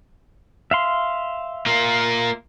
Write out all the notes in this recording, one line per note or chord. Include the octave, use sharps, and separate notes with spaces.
E5 F5 C6
A#3 F4